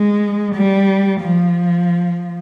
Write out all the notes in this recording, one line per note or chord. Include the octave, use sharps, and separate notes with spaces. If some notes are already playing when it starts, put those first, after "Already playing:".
Already playing: G#3
G3
F3